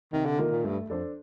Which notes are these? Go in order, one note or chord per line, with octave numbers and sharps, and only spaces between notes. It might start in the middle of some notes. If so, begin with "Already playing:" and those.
C3 D#3
D3
D#3 A#3 F4 A#4
A#2
G2 A3
F2 D4 A4 C5